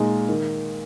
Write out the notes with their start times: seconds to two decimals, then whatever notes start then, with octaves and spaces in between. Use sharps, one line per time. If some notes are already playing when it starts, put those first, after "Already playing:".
Already playing: A#2 G#3 D#4
0.29 D#3